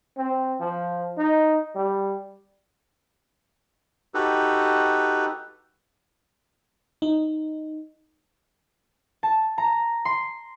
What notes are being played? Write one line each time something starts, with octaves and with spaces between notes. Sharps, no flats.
C4
F3
D#4
G3
D#4 F#4 G4 A4 B4
D#4
A5
A#5
C6